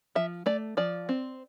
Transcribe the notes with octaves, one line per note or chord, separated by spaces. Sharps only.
F3 E5
A3 D5
F3 D5
C4